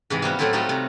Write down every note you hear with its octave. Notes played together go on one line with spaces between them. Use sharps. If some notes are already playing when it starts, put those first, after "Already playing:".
G#2 C3 E3
G3 A#3 B3 F#4
A2 F#3 A3 C4 E4 F4
G3 A3 D#4 F4 F#4
C3